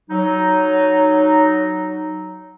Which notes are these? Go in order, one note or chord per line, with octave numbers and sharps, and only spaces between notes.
F#3 D#4